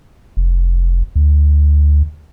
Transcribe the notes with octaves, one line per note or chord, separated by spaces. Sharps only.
F1
D2